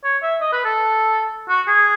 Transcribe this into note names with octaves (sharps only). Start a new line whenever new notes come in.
C#5
E5
D#5
B4
A4
F#4
G#4